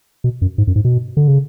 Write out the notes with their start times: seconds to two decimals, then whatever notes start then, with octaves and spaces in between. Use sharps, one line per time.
0.24 B2
0.42 F#2
0.58 G#2
0.67 F#2
0.76 G#2
0.85 B2
1.17 D3
1.28 C#3